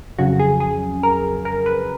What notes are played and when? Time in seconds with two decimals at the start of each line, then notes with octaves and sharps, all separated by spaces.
0.18 F2 C#3 F#3 F#4
0.39 G#4
0.60 G#4
1.03 A#4
1.45 A#4
1.66 B4